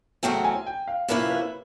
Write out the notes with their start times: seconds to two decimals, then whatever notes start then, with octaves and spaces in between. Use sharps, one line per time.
0.23 E2 C#3 F#3 A3 C4 G5
0.44 G#5
0.66 G5
0.88 F5
1.08 C3 F3 A#3 C#4 E4 B4
1.30 B4